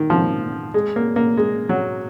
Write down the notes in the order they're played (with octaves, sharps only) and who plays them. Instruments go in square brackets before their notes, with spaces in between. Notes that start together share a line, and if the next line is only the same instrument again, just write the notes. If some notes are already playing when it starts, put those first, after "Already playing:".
Already playing: [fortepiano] D#3
F3
G#3
A#3
A#3
G#3
F#3